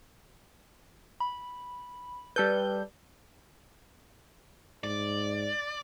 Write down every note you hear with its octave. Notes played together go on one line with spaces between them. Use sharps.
B5
G3 A4 B4 G6
G#2 D5